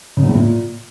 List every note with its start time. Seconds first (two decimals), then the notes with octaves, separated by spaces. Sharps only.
0.17 C#3
0.23 E2
0.28 A2
0.34 A#2